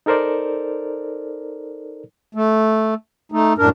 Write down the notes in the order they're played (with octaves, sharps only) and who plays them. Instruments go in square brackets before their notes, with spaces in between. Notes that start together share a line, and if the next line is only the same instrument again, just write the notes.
[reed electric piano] D#4 A4 A#4 C5 D5
[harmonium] A3
A3 D#4
F#2 A2 D4 A#4